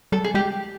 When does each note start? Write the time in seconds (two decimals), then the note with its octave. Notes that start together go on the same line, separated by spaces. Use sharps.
0.12 G3 A4
0.24 G#4
0.34 G#3 G4